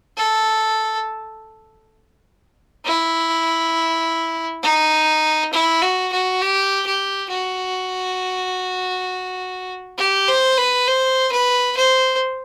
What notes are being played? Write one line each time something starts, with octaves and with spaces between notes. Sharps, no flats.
A4
E4
D#4
E4
F#4
F#4
G4
G4
F#4
G4
C5
B4
C5
B4
C5